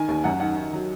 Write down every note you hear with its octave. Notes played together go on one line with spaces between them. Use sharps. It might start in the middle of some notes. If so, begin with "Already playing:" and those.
Already playing: D#3 G#5
D#2
F#2 F#5
D#3 F#5
D#3
F#3